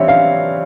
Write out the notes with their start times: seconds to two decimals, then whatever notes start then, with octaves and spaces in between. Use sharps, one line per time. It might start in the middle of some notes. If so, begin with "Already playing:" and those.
Already playing: E3 G3 C4 F4 C#5 E5
0.08 F5